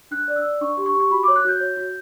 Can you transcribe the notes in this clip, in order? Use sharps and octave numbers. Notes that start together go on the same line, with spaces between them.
D4 F#6
D5
E6
D5
D4 C#6
G4
C#6
G4
C#6
F#4 B5
C#5 D6
F#6
F#4 G6
C#5
F#4